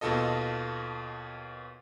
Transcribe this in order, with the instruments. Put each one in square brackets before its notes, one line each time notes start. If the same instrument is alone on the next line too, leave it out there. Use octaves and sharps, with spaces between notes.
[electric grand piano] D#2 B2 F4 A4 D#5